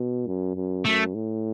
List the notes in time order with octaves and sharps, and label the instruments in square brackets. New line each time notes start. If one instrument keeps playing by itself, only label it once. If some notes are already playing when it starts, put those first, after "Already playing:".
Already playing: [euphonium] B2
F#2
F#2
[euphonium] F#2 [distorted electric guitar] A3
[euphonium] A2